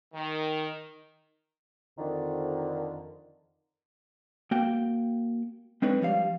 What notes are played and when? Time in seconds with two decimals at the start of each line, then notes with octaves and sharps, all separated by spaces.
0.13 D#3
1.98 F2 D3 D#3
4.51 A#3 F#4 G5
5.82 G#3 C4 D4 D#4 B4 C#5
6.02 F3 G3 F5